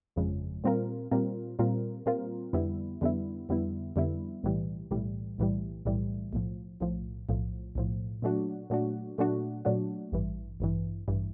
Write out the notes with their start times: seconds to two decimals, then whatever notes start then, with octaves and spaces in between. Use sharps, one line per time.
0.16 G1 F2 C#3 F3 G#3
0.64 A#2 G3 C4 F4 A#4
1.11 A#2 G3 C4 F4 A#4
1.59 A#2 G3 C4 F4 A#4
2.06 A#2 G3 C4 F4 A#4
2.53 F2 D3 G3 B3 E4
3.01 F2 D3 G3 B3 E4
3.49 F2 D3 G3 B3 E4
3.96 F2 D3 G3 B3 E4
4.43 B1 A2 E3 G3
4.91 B1 A2 E3 G3
5.38 B1 A2 E3 G3
5.85 B1 A2 E3 G3
6.33 B1 A2 F3
6.80 B1 A2 F3
7.29 B1 A2 F3
7.75 B1 A2 F3
8.22 A#2 F#3 A3 D4 F#4
8.70 A#2 F#3 A3 D4 F#4
9.18 A#2 F#3 A3 D4 F#4
9.65 A#2 F#3 A3 D4 F#4
10.12 A1 G2 E3
10.60 A1 G2 E3
11.08 A1 G2 E3